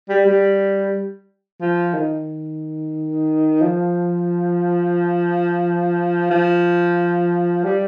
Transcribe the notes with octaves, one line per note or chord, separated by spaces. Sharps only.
G3
G3
F3
D#3
F3
F3
G3